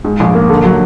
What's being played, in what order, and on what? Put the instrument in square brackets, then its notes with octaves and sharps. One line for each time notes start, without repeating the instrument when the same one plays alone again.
[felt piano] G#2
A#1
A#3
D3
F#3